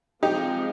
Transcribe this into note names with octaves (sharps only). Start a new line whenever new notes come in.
F3 G#3 C4 D#4 G4